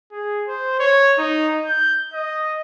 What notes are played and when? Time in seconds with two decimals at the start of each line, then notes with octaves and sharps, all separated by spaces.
0.12 G#4
0.47 C5
0.79 C#5
1.19 D#4
1.65 G6
2.14 D#5